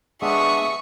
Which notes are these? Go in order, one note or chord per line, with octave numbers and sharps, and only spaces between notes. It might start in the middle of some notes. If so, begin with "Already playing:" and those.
G#3 B3 D4 E5 C#6 D#6